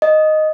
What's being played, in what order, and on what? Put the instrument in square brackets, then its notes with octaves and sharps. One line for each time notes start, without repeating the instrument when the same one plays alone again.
[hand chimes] D#5